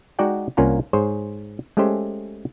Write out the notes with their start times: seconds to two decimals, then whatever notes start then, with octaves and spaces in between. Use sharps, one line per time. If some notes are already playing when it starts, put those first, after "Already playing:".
0.19 G#3 D#4 F#4 D5 F#5 G5
0.57 C2 A#3 C#4 F4 F#5 A#5
0.93 G#2 G#4 C5 C#5
1.77 G#3 A3 C#4 G4 C5